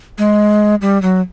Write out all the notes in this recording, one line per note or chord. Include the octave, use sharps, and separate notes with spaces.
G#3
G3
F#3